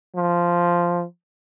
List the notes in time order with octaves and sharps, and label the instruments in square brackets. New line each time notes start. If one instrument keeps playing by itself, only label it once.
[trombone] F3